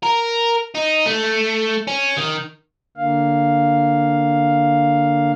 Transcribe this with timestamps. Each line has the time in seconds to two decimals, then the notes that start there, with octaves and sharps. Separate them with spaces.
0.03 A#4
0.75 D#4
1.06 A3
1.87 C#4
2.17 D#3
2.97 D3 A#3 F5